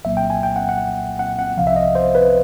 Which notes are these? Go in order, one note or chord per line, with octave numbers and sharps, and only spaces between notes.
C2 A#2 F#3 A#3 E5
G5
G#5
G5
F#5
F#5
F#5
F#5
C2 C3 F3 F5
E5
D#5
C5
B4